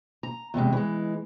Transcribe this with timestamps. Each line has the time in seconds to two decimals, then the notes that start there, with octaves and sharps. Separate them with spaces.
0.23 A#5
0.54 E2 G2 C3 G#3
0.72 E3 G#3